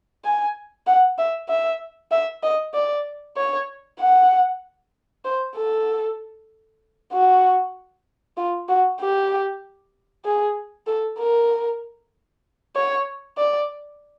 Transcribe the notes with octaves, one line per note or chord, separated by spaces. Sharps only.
G#5
F#5
E5
E5
E5
D#5
D5
C#5
F#5
C5
A4
F#4
F4
F#4
G4
G#4
A4
A#4
C#5
D5